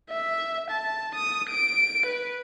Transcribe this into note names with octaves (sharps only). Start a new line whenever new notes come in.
E5
A5
D#6
D7
B4